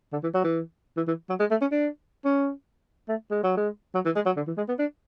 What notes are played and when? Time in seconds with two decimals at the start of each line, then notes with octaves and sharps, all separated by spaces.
0.13 D3
0.23 E3
0.34 F#3
0.44 E3
0.97 E3
1.08 E3
1.29 F#3
1.40 G#3
1.51 A3
1.61 C#4
1.72 D4
2.25 C#4
3.09 A3
3.31 G#3
3.43 F#3
3.57 G#3
3.94 F#3
4.05 E3
4.15 G#3
4.26 F#3
4.36 D3
4.47 E3
4.57 G#3
4.68 B3
4.79 D4